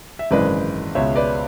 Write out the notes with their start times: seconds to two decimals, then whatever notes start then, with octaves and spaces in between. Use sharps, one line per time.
0.19 E5
0.31 G#1 F#2 C#3 E3 G#3 B4 D5
0.95 C#2 B2 G#3 C#5 E5
1.16 B4 D5